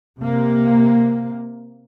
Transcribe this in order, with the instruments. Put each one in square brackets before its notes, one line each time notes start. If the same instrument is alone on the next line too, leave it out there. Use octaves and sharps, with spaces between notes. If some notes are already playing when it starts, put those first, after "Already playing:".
[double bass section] C3 A#3